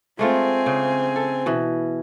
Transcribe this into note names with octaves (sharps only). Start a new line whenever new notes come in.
G#3 A3 C4 F4 G#5
C#3
A4
B2 E3